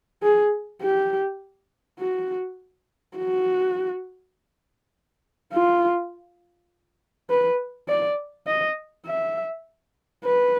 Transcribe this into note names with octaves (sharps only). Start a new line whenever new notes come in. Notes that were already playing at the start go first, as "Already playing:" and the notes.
G#4
G4
F#4
F#4
F4
B4
D5
D#5
E5
B4